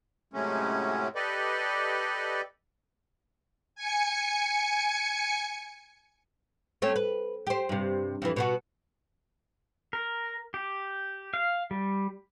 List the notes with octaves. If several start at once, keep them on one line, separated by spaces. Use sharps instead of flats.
A2 C3 F#3 G#3 A3 C#4
G4 A4 B4 D5 D#5
G#5 C#7
A3 C4 C#4
B4
G4 C5
G2 C3
F2 D#3 E3
B2 B3 F#4
A#4
G4
F5
G3